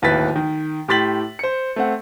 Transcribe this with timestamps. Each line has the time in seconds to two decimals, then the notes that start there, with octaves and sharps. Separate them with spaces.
0.02 D1 D#2 E4 B4 A6 B6
0.36 D#3
0.88 A2 G4 C6 A6 B6 F#7
1.39 C5 C#7
1.76 A3 C4 F#5